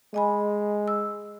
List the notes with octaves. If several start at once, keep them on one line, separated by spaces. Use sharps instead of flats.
G#3 D#5 G#5 B5
E6